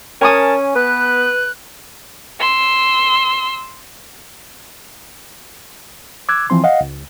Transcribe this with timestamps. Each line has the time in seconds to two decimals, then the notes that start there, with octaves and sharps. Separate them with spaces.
0.21 C#4 A#4 G#5 A5 C#6 D#6
0.76 B3 B4 F#6
2.40 C6 E6
6.29 D6 E6 F#6 G#6
6.50 E3 F3 C4 C6
6.64 D#5 F5 F#5
6.81 C#2